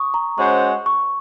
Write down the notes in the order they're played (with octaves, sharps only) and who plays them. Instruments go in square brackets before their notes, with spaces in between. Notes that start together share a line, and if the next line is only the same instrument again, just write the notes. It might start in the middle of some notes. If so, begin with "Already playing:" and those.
Already playing: [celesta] C#6 D#6
A#5
[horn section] G#3 C#4 F#4 C5 [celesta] C#6
[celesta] C#6